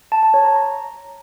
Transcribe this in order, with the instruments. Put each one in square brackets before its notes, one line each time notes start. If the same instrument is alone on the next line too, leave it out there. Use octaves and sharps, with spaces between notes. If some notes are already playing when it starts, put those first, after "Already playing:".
[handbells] A5
A5
C#5
A#5
A#5